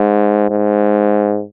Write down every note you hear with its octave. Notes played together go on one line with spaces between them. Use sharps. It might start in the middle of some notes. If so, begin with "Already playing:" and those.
Already playing: G#2
G#2